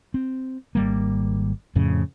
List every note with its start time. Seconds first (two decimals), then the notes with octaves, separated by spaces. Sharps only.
0.14 C4
0.75 G#1 G3 A#3
1.75 F2 A2 C#3